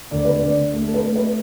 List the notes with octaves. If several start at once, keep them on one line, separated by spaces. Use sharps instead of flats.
D2 D5
B4
D3 D5
A3
A4
B4
A3
B4